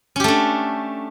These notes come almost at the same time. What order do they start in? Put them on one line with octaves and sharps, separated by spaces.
C#4 G4 A3 D4